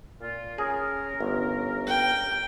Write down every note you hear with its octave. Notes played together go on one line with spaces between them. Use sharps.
A#2 F4
C#4 G#4 A#4
G1
G5